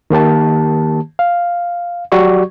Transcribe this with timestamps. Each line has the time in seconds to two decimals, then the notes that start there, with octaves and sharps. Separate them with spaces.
0.10 D#3 A#3 G4 A5
1.19 F5
2.12 F#3 F#4 G4 D5 C#6